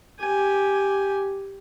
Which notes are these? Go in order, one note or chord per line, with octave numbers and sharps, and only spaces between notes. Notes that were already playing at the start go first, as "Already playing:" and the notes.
G4 G#5